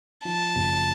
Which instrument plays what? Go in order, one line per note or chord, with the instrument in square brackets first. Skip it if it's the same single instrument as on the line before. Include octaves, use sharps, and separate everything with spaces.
[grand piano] F3 [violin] A5
[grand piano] F#1